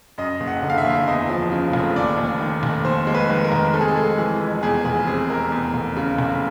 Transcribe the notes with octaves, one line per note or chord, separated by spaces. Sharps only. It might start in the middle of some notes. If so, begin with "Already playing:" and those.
F#2 D#5
F#1
F#5
D3
F5
E5
F#1
E2 D#5
F3
C#3
F1
D#2 D5
F1
D#3
F1
D#2 C5
G#3
B4
D#3
A#4
F1
C3 A4
G#4
A4
G#3
E3 G#4
F2
E2 G#4
F1 G#4
C3 G#4
F1 A#4
E2
F1
C#3
F1